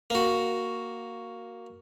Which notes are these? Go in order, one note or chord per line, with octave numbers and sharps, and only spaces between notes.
A#3 F#4